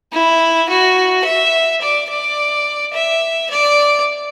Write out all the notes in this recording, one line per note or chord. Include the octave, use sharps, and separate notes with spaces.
E4
F#4
E5
D5
D5
E5
D5